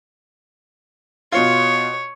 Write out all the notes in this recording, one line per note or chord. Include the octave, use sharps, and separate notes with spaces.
B2 F4 C#5